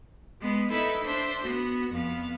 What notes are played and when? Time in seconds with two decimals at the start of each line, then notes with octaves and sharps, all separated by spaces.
0.41 G#3 B3
0.71 D#4 E4 A4 B4 E5
1.05 D4 C5 E5
1.43 B3 F#4
1.92 F2 B3 F5